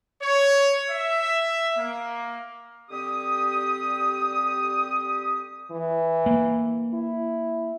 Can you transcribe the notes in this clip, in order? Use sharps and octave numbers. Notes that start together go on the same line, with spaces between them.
C#5
E5
A#3
D3 G3 C4 G4 D#6
E3
A#3
E4